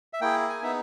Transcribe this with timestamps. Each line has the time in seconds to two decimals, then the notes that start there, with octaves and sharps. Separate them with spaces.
0.13 E5
0.21 A#3 E4 G#4 G5
0.49 G#5
0.62 B3 D#4 G#4 E5